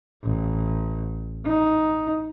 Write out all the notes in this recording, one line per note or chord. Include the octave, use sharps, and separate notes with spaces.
A1
D#4